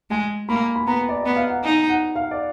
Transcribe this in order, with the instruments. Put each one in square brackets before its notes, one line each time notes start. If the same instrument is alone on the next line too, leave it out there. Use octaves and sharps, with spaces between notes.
[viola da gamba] G#3 [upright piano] G#5
[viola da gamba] A#3 [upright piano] B5
[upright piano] B5
[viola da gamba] B3 [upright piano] A#5
[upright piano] D5
[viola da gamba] B3 [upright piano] D#5
[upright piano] F5
F#5
[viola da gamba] D#4 [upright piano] G#5
[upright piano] F#5
F5
D5